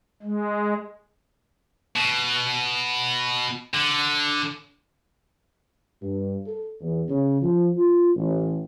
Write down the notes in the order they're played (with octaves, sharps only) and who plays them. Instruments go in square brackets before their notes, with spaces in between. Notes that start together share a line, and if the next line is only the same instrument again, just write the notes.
[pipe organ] G#3
[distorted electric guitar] B2
D3
[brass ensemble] G2
A4
E2
C#3
F3
F4
A1